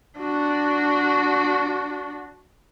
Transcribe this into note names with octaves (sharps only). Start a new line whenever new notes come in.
D4 F#4